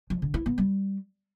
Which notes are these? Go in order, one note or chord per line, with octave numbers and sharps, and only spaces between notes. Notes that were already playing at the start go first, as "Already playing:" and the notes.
F3
D3
E4
B3
G3